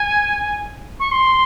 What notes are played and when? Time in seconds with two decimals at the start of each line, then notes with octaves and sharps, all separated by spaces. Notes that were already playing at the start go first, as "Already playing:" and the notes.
Already playing: G#5
1.00 C#6
1.11 C6